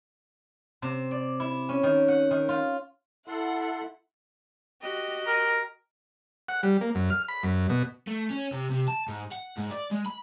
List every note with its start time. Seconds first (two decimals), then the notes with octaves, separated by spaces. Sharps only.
0.82 C3
1.11 D5
1.40 E4
1.69 C#4
1.83 D#3
2.08 F#5
2.31 D#3
2.49 F4
3.28 E4 A4 F#5 C6
4.81 F#4 G4 D#5
5.27 A#4
6.49 F#5
6.63 G3
6.81 A#3
6.95 F#2
7.10 F6
7.28 B5
7.43 F#2
7.70 B2
8.08 A3
8.30 C#4
8.52 C3
8.70 C3
8.88 A5
9.08 G#2
9.32 F#5
9.57 G#2
9.70 D5
9.91 G#3
10.06 B5